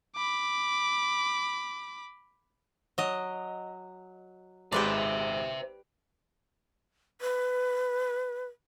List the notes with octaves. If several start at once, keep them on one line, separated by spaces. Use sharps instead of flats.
B5 D6
F#3 D#5
G#1 G#3 G4 B4 C5 D5 E5 C6
B4